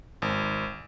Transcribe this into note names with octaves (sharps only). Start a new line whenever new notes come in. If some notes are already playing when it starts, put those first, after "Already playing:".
G#1